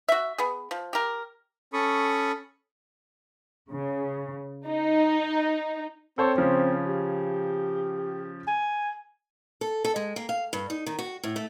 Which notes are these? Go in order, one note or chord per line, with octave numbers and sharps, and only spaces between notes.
F#4 E5
B3 G#4
F3
G4 A#4
C#4 A4 B5 C#6 D#6
C#3
D#4
C4 A4 C5 C#5
C#3 F3 C#4
G4
G#5
A4
A4
G#3
A#3
F5
G2
D#4
D#3
F#4
A2
A3